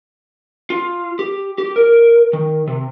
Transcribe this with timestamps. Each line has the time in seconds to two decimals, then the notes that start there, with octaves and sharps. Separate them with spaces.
0.70 F4
1.19 G4
1.58 G4
1.76 A#4
2.33 D#3
2.67 C3